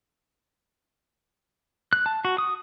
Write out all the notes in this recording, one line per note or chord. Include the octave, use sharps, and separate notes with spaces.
F#6
A5
F#4
D#6